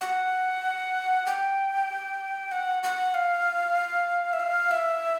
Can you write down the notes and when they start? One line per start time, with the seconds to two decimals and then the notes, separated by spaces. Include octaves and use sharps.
0.01 F#5
1.26 G5
2.52 F#5
2.83 F#5
3.14 F5
4.33 E5
4.40 F5
4.71 E5